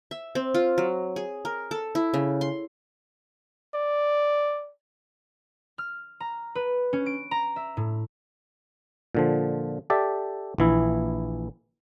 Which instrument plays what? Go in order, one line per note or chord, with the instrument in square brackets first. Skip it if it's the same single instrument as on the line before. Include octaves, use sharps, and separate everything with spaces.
[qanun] E5
C4
F4
F#3
G#4
A#4
A4
E4
C#3
C6
[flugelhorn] D5
[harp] F6
A#5
B4
C#4
D7
A#5
E5
A2
[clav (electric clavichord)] A#2 D3 F3
G4 A4 D5 E5
A#1 E3 E4